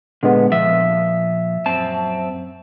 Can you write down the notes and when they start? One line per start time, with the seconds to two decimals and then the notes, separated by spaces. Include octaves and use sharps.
0.23 A#2 D3 G#3 B3
0.52 A#2 F3 E5
1.66 F#2 C4 A5